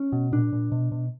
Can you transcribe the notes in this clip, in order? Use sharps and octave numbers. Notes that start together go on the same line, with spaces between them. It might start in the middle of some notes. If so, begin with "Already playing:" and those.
Already playing: C#4
B2
A#2 D4
A#2
B2
B2